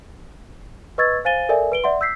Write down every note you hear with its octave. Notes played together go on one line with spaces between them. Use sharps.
B4 D#5 C#6 E6 G#6 A6
C5 F5 G#5 A6 D#7 G7
A4 A#4 D5 E5 G#5
B4 D7 G7
D5 E5 F#5 C6
E6 G6 B6 C7